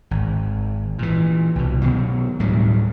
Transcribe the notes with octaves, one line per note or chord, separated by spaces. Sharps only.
G#1
A#2 E3
C2 B2
B2 D#3 F#3
D2 A2 F#3 G3